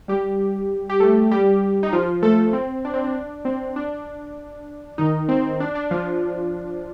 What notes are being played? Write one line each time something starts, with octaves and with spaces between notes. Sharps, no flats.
G3 G4
G4
A3 A4
G3 G4
D#4
F3 F4
A3 A4
C4
D4
C4
D4
C4
D4
D#3 D#4
C4
D4
D4
F3 F4